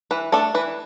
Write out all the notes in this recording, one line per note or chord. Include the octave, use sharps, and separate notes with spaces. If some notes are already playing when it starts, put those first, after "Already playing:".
E3 B4
A3 D4 A4
E3 B4